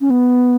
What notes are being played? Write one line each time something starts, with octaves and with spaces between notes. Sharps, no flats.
C#4
B3